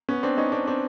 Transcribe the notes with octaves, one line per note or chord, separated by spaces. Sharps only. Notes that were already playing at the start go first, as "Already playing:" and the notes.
B3 C#4
C4 D4
C#4 D#4
C4 D4
C4 D4